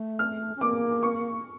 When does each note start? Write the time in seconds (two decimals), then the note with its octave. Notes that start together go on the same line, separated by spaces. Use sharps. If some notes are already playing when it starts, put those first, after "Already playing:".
Already playing: A3
0.19 F6
0.56 C#4
0.61 A#3 D6
1.03 C#6